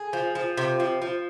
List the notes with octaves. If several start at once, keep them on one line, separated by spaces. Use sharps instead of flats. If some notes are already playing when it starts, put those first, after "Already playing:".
Already playing: G#4
F3
F3
C3
F3
F3